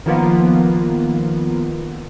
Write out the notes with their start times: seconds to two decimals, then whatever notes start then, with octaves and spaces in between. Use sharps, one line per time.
0.06 D#3 F3 A#3 B3 F4